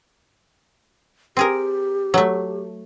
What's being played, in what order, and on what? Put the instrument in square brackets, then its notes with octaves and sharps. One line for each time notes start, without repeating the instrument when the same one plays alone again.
[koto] C4 G#4 A#4 [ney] G4
[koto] F#3 A3